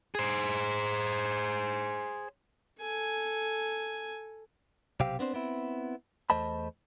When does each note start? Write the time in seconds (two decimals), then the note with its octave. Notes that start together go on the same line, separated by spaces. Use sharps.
0.15 G#4 C5
2.81 A4 G#5
5.00 B1 C3 C4 G4 F5
5.19 B3 C4 D4 C5
5.34 B3 C4 E4
6.30 E2 A3 C5 D#5 A5 B5